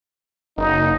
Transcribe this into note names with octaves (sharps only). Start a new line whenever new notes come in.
F#1 D#4